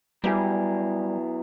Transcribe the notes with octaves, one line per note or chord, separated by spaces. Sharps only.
F#3 G3 B3 E4 G#4